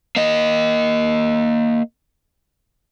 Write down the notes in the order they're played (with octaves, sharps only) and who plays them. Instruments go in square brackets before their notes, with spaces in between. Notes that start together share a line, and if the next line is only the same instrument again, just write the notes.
[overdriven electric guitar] A#3 D#5